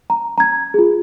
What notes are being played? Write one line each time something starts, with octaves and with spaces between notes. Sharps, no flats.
A#5
A#5 G#6
F4 G#4